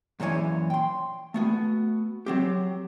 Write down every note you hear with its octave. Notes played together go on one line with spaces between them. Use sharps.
F#2 A#2 E3 C#5 G#5
G5 C6
A3 B3 F#4
F#3 C4 G4